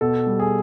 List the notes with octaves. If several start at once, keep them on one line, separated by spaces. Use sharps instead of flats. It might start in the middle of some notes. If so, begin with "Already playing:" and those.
B2 A4
G3
G#4